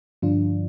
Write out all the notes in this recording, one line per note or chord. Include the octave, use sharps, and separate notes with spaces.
G2 D3 F3 D4 F4